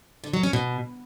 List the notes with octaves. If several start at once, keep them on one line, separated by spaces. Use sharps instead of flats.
D3
F#3
C#4
B2